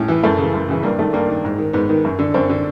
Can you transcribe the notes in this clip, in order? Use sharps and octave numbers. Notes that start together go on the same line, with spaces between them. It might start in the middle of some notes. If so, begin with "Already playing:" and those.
Already playing: A2 C#4
E3
F#2 A3
C#3 E3
F#2
C#3 E3
G2 A#3
D#3 A3
G2 A#3
D#3
G#2
D#3
G#2 B3
D#3
F#2
D3
F#2 C4
D3